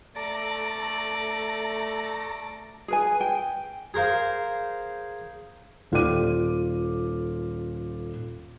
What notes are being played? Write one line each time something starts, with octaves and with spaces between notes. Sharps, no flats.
A3 A4 D5 A#5
G#4 B4 G#5
G5
G#4 A#4 C5 F5
D#1 F4 A4 D5 D6 D#7